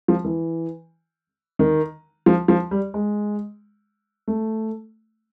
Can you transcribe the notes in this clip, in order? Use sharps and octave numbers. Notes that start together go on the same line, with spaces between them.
F3
E3
D#3
F3
F3
G3
G#3
A3